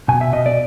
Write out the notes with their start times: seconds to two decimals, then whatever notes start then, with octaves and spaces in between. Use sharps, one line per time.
0.08 B2 G#5
0.21 E5
0.33 B2 D#5
0.46 D5